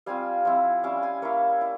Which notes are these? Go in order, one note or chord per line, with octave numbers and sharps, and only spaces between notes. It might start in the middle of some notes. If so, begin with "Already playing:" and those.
G3 C4 F4 F5 G#5
F3 C4 E4
G3 C#4 E4 F5 G#5
F5 G#5
A#3 E4 C#5 F5
E4